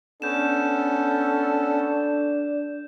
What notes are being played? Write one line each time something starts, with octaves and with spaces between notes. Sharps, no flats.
B3 C#4 D4 A4 G6 E7